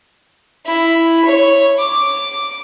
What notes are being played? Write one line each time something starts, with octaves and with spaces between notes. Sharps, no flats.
E4
C#5
D6